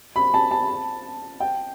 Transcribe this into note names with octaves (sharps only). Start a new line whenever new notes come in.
B5
A5
A5
G5